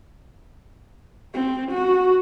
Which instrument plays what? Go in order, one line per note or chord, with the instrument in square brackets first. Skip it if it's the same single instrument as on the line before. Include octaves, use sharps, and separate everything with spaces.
[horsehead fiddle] C4
F#4